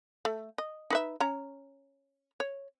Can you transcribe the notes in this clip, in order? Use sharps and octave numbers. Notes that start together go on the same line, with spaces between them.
A3
D#5
D#4 B4 E5
C#4 C#5 A#5
C#5